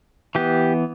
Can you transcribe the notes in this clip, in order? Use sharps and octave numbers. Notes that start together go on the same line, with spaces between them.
E3 B3 G4